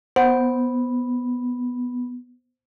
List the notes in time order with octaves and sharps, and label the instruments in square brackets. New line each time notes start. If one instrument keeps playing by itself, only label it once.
[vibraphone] B3 [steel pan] C5 [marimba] F#5